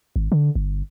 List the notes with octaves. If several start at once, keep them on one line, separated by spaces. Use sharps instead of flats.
G#1
D3
G1